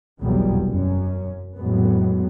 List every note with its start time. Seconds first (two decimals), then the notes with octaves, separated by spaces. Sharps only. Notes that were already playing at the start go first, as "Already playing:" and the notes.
0.19 F1 B1 E2 F#3 G3 B3
0.68 F#2 C#4
1.57 F2 A2 F#3 G#3 B3